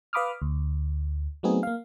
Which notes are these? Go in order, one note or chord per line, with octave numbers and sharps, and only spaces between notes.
B4 F5 B5 D6 D#6 F6
D2
F#3 A3 B3 C4 D#4 G#4
A#3 F5